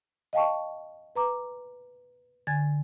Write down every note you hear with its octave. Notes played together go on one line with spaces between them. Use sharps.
D#5 F5 G5 A5 C#6
B4 A#5 D6
D3 G#5 G#6 A6